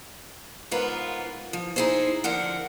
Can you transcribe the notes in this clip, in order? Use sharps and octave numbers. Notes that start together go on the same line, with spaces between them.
G#2 B3 F4 A#4 B4
F3
D#4 E4 G#4 A4 C5
D3 F3 A#4 F#5